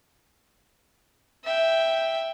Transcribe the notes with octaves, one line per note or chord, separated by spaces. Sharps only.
E5 G5